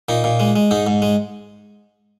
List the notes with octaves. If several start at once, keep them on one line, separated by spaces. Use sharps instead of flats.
A#2 D#4
A#2
G#3
G#3
G#2 D#4
G#2
G#3